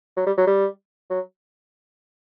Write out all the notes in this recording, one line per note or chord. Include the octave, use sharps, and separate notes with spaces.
F#3
G3
F#3
G3
F#3